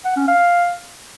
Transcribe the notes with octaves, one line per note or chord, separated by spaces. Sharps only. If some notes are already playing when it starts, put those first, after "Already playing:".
F#5
C#4
F5